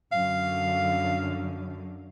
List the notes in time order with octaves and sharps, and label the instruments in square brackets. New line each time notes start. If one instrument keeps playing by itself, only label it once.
[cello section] F#2 D3 [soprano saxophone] F5